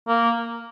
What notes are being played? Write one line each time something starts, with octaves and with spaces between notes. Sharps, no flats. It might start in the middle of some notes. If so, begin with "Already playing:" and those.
A#3